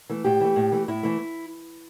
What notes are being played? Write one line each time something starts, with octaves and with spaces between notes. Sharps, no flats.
E3 A3
A2 G4
E3 A3
A2
E3 A3
A2 E4
E3 A3